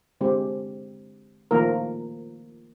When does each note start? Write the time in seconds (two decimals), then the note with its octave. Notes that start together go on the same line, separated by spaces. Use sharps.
0.21 D3 G#3 C4 G4
1.51 D#3 F3 A3 A#3 A#4